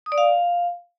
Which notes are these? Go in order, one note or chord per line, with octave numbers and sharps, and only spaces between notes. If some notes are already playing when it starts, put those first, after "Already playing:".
D#6
D5
F5